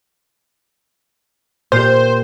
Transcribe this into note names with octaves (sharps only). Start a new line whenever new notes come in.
A#2 G4 C5